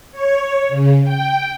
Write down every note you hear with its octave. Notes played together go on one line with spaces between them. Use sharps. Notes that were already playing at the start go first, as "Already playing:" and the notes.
C#5
C#3
G5